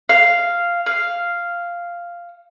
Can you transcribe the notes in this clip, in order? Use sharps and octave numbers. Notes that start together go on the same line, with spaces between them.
F5
F5